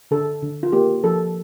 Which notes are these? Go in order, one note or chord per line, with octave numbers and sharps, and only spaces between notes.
D3 A4
D3
F4
A#3 G4
F3 A4